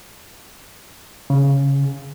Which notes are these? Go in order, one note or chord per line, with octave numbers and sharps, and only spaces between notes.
C#3